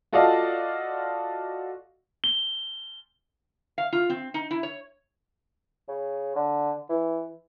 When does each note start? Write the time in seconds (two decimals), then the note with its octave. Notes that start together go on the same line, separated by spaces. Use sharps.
0.13 F4 F#4 A4 D5 D#5 F5
2.24 G7
3.78 F5
3.93 F4
4.10 C4
4.34 D#4
4.51 E4
4.63 C#5
5.88 C#3
6.35 D3
6.89 E3